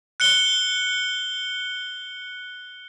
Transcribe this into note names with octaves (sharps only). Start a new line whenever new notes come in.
F#6 C#7 G7